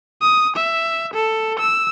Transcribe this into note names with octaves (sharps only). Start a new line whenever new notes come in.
D#6
E5
A4
E6